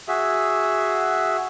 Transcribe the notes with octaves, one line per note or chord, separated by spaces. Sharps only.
F#4 G#4 E5